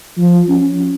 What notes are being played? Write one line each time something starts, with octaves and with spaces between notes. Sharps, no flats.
F3
C#4